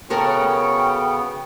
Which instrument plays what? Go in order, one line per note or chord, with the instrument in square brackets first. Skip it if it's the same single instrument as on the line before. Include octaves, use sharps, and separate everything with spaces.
[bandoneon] C#3 B3 [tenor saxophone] C#4 [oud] F#4 A4 A#4 [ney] G5